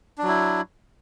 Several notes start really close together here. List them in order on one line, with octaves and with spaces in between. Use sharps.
D4 F#3 E4